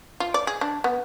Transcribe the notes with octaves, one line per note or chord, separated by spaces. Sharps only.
F4
D5
G#4
D4
B3